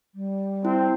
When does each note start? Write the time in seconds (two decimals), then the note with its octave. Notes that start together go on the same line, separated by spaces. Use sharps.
0.15 G3
0.65 C4 E4